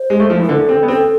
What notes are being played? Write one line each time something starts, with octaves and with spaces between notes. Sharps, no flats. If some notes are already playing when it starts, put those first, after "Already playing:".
Already playing: C5
G#3
A3
F3
E3
D3 A4
C4
B3
C4 A4